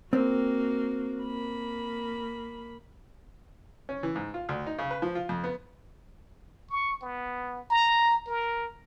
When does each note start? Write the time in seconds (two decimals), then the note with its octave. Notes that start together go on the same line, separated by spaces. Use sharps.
0.13 A#3 C4 F#4
1.23 A#3 B5
3.89 C#4
4.03 E3
4.16 G#2
4.34 F4
4.49 D2
4.67 D#4
4.78 C#3
4.91 B4
5.02 F3
5.15 F4
5.29 F2
5.44 B3
6.70 C#6
7.02 B3
7.70 A#5
8.27 A#4